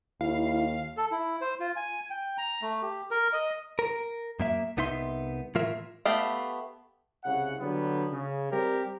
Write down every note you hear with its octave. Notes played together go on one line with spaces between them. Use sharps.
D#2 E4 F5
A4
E4
C5
F4
G#5
G5
A#5
A3
G4
A#4
D#5
A#4
F#2 A#3 E5
C2 B3 D#4 E5 C6
A2 E3 F4 A#4 E5
A3 B3 G4 F5
C2 C#3 F#5
D3 F#3 G3 B3
C#3
G3 C4 G4 A#4